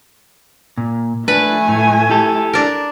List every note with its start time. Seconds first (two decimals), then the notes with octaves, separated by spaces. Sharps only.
0.78 A#2
1.28 A3 D4 B4 G#5
1.68 A2
2.10 E4 G4 A4
2.53 D4 A#4